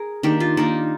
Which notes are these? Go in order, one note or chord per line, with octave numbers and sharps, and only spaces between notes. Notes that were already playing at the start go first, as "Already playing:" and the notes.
Already playing: G#4 A#4
D#3 A#3 D4 G4
F4
D#3 A#3 D4 D#4